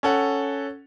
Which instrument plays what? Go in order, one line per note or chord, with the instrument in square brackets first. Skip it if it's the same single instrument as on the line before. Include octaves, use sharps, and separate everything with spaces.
[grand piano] C#4 A4 F#5